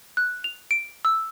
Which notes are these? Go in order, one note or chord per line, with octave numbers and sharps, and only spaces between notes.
F#6
F7
D7
E6